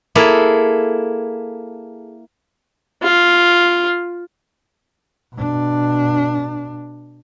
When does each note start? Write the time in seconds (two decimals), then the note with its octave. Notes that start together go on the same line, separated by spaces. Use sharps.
0.15 A#3 E4 G#4 A4
3.03 F4
5.36 B2 D4